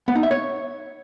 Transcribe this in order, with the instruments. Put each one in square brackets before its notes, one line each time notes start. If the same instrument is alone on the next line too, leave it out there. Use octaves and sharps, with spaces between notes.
[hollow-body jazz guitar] B3
D#4
E5
C#5